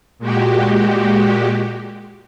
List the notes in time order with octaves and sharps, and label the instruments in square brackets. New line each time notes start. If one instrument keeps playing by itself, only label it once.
[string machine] A#2 G#3 F#4 G4